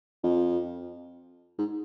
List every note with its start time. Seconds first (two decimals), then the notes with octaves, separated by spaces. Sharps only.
0.23 F2
1.58 G#2